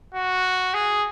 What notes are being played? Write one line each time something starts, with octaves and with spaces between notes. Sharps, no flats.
F#4
G#4